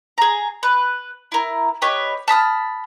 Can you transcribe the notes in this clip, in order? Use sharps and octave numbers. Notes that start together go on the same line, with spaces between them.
G#4 A#5
B4
E4 A#4
G4 B4 C#5 D#5
A5 B5 D#6 F6